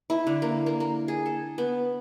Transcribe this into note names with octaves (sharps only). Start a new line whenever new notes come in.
E4
D3
A#3
A#3
A#3
G#4
A4
B3